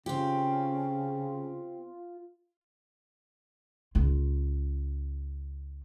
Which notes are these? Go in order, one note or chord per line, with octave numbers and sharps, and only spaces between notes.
C#3 C4 C#4 F4 G4
C#2 F4